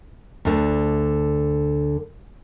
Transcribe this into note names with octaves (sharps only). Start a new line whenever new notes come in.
D2 D3